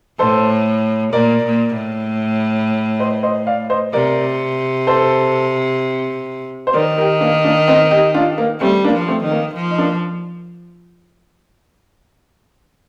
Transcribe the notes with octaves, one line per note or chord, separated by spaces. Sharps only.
A2 A4 C5
A#2 A#4 D5
A#2
A2
C5 D#5
C5 D#5
D5 F5
C5 D#5
C3 A#4 D5
A4 C5
C5
D#3 A#4 D5
G4 A#4
A#3 D4
A#3 D4
C4 D#4
D#4 G4
D4 F4
A#3
G3 A3 C4
A#3 D4
F3
A3 C4
D#3
A#3
F3
D#4
A#3 D4